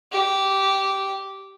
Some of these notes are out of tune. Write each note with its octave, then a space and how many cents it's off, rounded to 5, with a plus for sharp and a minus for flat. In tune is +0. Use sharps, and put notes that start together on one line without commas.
G4 -15